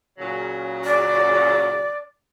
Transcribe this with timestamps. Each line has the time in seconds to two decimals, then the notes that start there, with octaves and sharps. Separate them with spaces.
0.18 A#2 C#3 F#3
0.84 D5